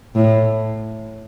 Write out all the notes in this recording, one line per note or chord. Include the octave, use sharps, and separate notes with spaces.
A2